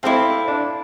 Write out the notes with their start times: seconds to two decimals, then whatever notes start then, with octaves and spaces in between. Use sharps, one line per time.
0.03 C4 E4 A4 D5 F5
0.48 D4